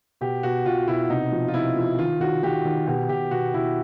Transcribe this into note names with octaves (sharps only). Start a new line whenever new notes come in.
B2 G4
B2 F#4
B2 F4
B2 E4
C3 D#4
F3
F4
C3 E4
F3
D#3 F4
D#3 F#4
D#3 G4
D#3
B2 G4
B2 G4
B2 F#4
B2 E4